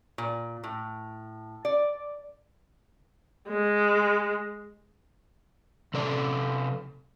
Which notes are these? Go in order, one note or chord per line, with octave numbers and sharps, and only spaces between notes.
A#2
A2
D5
G#3
C3 A4 D5